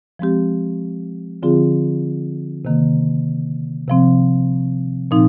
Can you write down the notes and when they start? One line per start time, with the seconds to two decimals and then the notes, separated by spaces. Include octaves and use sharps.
0.19 F3 G#3 C4 G4
1.43 D3 F3 C4 F4 G#4
2.65 C3 D#3 A#3
3.88 C3 F3 C4
5.11 A#2 F3 C4 D#4